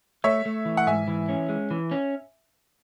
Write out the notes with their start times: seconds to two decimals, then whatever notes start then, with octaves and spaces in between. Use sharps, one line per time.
0.24 A3 C#5 E5
0.46 A3
0.65 E3
0.77 F#5
0.86 G#2 E5 G#5
1.08 E3
1.29 C#4
1.49 G#3
1.71 E3
1.91 C#4